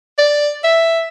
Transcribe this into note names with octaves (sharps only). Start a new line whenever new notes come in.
D5
E5